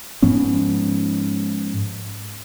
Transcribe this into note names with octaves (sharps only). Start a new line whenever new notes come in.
G#2 F3 B3 C#4